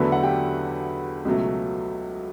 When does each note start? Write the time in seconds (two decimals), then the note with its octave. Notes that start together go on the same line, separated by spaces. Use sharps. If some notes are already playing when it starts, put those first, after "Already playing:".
Already playing: E2 D3 F#3 A3 B4 B5
0.12 F#5
0.23 G4 G5
1.25 C#2 B2 F#3 A3